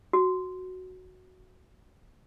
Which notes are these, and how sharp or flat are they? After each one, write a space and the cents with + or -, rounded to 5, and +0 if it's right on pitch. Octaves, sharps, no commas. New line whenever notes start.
F#4 +0